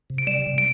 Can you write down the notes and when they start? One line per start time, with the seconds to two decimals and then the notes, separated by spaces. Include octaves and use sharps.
0.10 C3
0.18 D7
0.27 G3 E7
0.46 C3
0.58 D7